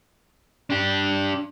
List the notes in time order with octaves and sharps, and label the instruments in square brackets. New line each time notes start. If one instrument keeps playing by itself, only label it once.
[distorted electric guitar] D4 G4